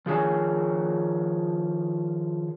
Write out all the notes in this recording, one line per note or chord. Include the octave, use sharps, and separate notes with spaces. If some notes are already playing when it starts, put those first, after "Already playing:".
D#3 F3 G#4 C#5 G#5